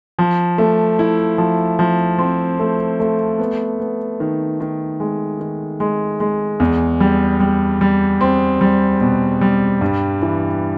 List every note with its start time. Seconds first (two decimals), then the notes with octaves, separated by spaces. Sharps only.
0.19 F3
0.58 A3
0.99 E4
1.38 F3
1.79 F3
2.19 C4
2.59 A3
3.00 A3
3.39 B3
3.80 B3
4.20 D#3
4.60 D#3
5.00 G#3
5.40 D#3
5.80 G#3
6.20 G#3
6.60 E2
7.00 G3
7.40 G3
7.81 G3
8.21 C4
8.61 G3
9.01 B2
9.41 G3
9.81 G2
10.22 E3